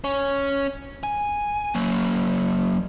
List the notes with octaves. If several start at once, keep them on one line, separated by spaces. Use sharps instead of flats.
C#4
G#5
F#3 A#3